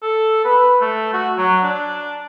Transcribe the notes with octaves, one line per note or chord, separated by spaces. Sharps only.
A4
B4
A3
F#4
F#3
D4